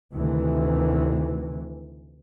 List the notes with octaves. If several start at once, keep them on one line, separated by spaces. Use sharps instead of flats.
D2 C3 D#3 E3